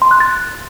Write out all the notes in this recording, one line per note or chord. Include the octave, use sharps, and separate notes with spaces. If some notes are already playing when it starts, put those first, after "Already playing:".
C6
F#6
A6